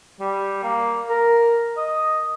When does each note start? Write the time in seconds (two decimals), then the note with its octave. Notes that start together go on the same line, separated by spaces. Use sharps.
0.20 G3
0.63 A#3
1.10 A#4
1.77 D#5